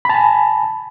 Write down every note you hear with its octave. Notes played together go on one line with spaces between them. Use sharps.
G#5 A5 B5